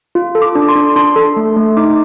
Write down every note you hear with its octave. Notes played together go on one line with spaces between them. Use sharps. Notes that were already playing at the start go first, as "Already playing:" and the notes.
F4
A4
D6
D4
C6
D4
D4 C6
A4
A3
A3
D#4 D6